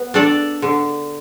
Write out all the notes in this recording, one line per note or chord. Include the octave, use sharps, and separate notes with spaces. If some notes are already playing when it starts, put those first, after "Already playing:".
Already playing: B3
D4 A4 D5
D3